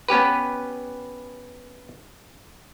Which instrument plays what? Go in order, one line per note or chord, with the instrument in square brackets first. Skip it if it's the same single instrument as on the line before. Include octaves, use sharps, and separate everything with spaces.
[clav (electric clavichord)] B3 C#4 G4 B4